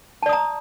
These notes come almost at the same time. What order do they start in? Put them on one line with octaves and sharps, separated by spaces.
A5 D5 D#6 A#5